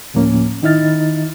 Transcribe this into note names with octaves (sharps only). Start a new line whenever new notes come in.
D2 A2 F3 A#3 C#4
D#3 D#4 E4 D#5 F6 A6